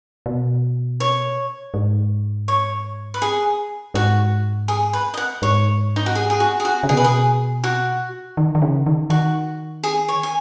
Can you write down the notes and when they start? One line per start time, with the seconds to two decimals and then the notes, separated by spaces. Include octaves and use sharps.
0.26 B2
1.00 C#5
1.74 G#2
2.48 C#5
3.14 B4
3.22 G#4
3.94 G#2 F#4
4.68 G#4
4.93 B4
5.14 D#5
5.17 F#5
5.42 G#2 C#5
5.96 D#4
6.06 F#4
6.15 G#4
6.30 G#4
6.40 F#4
6.60 G#4
6.65 F#4
6.83 C#3
6.89 B2 G#4
6.97 B4
7.04 G#4
7.64 F#4
8.37 D#3
8.55 D#3
8.62 C#3
8.86 D#3
9.10 D#3 F#4
9.83 G#4
10.08 C#5
10.23 G#5